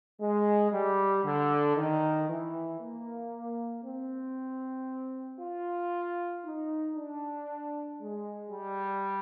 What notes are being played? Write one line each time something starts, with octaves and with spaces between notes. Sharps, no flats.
G#3
G3
D3
D#3
E3
A#3
C4
F4
D#4
D4
G#3
G3